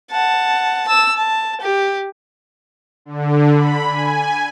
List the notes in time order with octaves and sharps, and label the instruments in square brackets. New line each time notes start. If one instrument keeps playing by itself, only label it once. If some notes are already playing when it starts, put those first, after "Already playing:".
[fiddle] F#5 A5
A5 E6
A5
G4
[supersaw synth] D3
B5
G#5